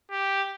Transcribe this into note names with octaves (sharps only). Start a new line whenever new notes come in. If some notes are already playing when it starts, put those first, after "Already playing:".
G4